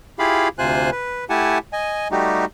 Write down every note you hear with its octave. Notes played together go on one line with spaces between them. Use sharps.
E4 F4 G4 G#4 F5 B5
D2 C3 F4 C5 G#5 F#6
B4
A3 E4 G4 F#5 G#5 A5
D#5 G#5
G3 A3 D#4 F#4 G4